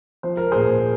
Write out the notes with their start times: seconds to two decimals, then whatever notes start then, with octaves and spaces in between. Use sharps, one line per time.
0.23 F3 C5
0.37 A#4
0.52 A#2 G#4 C5